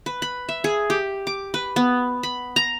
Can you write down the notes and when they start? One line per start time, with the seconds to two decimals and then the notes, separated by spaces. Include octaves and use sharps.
0.06 B4
0.22 B5
0.49 E5
0.64 G#4
0.90 G4
1.27 D6
1.54 B4
1.76 B3
2.23 B5
2.56 A#5